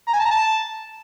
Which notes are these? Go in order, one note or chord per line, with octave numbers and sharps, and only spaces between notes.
A#5
G#5
A5
A#5
A5